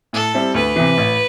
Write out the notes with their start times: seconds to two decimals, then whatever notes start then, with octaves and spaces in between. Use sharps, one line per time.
0.13 A2 A4
0.34 G3 C4 E4
0.55 D2 B4
0.76 C3 E3
0.97 A1